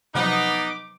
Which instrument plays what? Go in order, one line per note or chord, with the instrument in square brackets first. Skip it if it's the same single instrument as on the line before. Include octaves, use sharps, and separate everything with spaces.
[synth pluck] C3 F3 F#3 [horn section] B3 D#4 [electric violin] D6